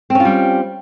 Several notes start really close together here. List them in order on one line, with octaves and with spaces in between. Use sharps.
C4 C#4 F4 G3